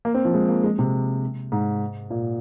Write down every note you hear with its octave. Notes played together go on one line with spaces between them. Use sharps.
A#3
C4
F3
G#3
A#3
G#3
C3
G#2
A#2